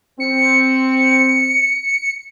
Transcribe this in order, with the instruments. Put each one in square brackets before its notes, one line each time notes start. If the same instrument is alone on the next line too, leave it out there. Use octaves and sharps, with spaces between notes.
[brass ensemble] C4 [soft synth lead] C#7